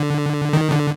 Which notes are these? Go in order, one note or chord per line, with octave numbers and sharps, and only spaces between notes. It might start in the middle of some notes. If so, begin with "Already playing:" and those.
Already playing: D3
D#3
D3